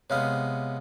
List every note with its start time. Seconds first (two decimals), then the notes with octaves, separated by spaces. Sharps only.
0.10 C3 G#3 B3 C#5 F5 F6